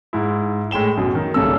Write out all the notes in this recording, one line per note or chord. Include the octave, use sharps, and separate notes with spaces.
G#2 E4
A2 G#3 G5 E7 G7
F#2 B2
D#3
G1 C2 C#3 A#3 A4 E6